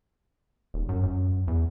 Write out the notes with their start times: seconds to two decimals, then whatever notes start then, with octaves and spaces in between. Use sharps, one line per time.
0.74 D#1
0.89 F#2
1.03 F#2
1.48 E2